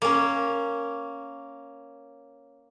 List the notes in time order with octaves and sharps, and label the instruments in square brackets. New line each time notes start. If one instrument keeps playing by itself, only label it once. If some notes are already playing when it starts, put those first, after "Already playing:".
[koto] A#3 C#4